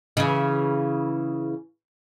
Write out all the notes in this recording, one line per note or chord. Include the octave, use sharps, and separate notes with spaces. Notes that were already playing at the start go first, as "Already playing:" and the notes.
C#3 E3